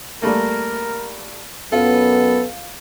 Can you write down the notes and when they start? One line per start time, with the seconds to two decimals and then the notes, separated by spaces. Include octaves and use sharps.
0.22 G3 A3 A#3 A#4
1.72 F#2 B3 F4 A4